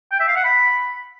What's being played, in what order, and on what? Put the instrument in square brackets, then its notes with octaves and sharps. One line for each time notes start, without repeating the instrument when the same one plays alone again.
[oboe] G5
E5
F5
F#5
B5